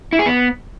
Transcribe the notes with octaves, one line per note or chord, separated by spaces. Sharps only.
E4
G#4
B3